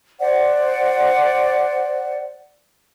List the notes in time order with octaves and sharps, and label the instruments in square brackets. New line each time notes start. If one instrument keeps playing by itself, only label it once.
[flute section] C5 D5 F#5